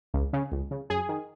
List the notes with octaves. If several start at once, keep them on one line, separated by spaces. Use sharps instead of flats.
C#2
C#3
C#2
C#3
F#2 G#4
D#3